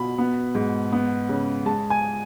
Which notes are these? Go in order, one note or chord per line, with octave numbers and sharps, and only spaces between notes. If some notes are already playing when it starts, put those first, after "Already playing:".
Already playing: B2 B5
B3
G#2
B3
C#3
G#3 A5
G#5